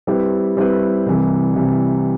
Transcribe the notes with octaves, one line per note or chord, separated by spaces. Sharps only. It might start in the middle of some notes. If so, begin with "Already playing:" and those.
G3 C4 E4 G4 B4
G3 C4 E4 G4 B4
C2 C3 E3 G3
C2 C3 E3 G3